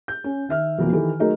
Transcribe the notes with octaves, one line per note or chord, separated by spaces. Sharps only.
G6
C#4
D#3 E5 F6
F2 B2 E3 F#3 A#3
D#3 E3 E4 G4 A4
F#3 A3 D#4 G#4 A#4